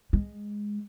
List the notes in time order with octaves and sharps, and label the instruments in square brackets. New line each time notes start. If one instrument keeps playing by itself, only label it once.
[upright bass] G#3